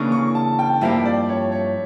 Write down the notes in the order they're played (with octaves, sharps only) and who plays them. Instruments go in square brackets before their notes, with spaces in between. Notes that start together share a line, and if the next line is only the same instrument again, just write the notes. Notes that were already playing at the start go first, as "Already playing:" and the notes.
Already playing: [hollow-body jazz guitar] C#3 E3 A#3 D4 [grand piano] C#6
[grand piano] C#6
A5
G5
[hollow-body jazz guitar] G2 F3 A#3 E4 G4 [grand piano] E5
[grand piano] D5
C#5
C#5